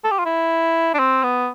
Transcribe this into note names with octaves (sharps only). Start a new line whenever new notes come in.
A4
G4
F4
E4
D4
C4
B3